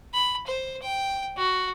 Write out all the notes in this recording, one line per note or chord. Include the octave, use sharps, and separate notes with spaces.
B5
C5
G5
F#4